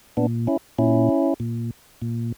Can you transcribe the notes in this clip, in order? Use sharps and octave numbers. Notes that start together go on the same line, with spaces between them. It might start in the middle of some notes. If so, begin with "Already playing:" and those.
A#2 B3 D4
C#4 E4
A#2 C#4 E4
A#2
A#2